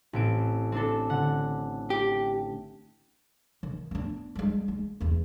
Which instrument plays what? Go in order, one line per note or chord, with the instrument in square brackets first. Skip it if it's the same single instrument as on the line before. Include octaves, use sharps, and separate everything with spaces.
[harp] A1 C4 D7
C4 D4 A4
D3 F#5
[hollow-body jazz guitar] G4
[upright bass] D#3
B3 D4
G3 G#3
G#3
E2 E3